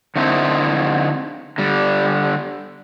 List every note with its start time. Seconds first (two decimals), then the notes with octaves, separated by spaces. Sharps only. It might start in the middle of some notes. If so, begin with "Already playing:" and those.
0.16 D3 A3 A#3 C4 D#4 E4
1.58 D3 G3